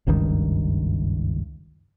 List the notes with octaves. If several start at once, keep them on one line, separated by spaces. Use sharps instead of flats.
F#1 C#2 G2 D#3